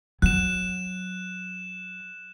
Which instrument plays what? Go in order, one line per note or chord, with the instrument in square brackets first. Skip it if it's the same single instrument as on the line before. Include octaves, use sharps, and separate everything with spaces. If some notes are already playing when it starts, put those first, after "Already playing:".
[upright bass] F#3 [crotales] F#6 E7